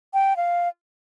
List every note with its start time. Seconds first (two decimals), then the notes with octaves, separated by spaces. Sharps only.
0.14 G5
0.37 F5